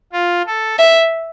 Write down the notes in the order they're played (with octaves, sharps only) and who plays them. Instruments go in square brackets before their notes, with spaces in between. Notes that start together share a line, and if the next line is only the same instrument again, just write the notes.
[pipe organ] F4
A4
[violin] E5